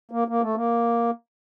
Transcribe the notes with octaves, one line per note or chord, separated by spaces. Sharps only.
A#3
A#3
A3
A#3